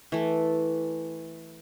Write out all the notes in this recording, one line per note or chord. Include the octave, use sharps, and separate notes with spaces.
E3 A3